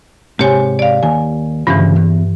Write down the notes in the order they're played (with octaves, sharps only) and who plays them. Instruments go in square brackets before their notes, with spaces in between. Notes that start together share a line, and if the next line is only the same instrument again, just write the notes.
[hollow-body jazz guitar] G#2 C3 [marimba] G4 C#5 G#5
[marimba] D5 F5
[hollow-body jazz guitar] D#2 [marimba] G#5
[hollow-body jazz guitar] D2 C#3 F3 [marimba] G2 E3
[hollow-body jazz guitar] E2